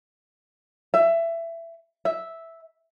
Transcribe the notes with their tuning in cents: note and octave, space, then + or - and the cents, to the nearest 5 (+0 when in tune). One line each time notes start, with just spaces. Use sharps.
E5 +20
E5 -5